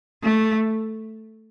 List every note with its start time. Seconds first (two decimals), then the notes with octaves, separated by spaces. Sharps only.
0.23 A3